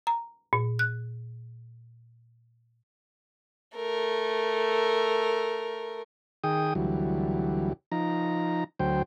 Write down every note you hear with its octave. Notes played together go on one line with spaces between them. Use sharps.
A#5
A#2
F#6
A3 A#4
D#3 G#4 G5 D#6
D2 E3 F#3 G3
F3 D#4 A#5
D2 F#3 C5 G5